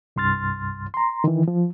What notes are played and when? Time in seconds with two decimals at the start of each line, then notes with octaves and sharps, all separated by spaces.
0.16 C2 G2 C6 F6 A6
0.94 A#5 C6
1.24 D#3 E3
1.48 F3